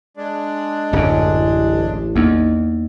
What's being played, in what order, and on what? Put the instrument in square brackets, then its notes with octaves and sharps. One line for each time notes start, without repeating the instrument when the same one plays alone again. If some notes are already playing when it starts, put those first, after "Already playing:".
[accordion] G#3 D4
[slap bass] D1 F#2 [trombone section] A1 [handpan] C#4
[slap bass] E2 [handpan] A#3 D#4